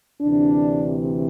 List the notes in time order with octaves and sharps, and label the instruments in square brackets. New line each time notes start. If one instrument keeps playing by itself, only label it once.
[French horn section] D2 C3 E3 D4